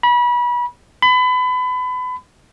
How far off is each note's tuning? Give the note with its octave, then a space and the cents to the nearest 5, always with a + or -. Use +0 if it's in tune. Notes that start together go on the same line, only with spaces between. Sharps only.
B5 -30
B5 +30